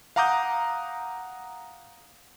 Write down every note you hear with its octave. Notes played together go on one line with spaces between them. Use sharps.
F5 F#5 A#5 D6 D#6 G6